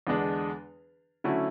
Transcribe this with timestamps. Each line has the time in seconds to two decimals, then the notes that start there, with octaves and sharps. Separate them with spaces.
0.07 E2 D3 G#3 D4
1.24 D3 F#3 A3 C#4 E4